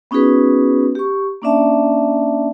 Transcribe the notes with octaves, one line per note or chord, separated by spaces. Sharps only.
B3 C#4 D#4 F#4 G#4 B4
G4 C#6
A#3 C#4 D4 D5 E5 A5